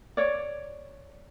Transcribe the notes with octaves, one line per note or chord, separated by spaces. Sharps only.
C#5 D5